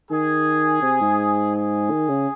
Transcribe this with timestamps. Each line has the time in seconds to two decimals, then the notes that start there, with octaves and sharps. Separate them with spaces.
0.11 D#3 G#4
0.82 C3
1.01 G#2
1.54 G#4
1.91 D#3
2.09 C#3